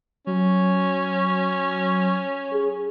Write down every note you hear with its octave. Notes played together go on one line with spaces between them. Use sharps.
F#3 C#4
G#4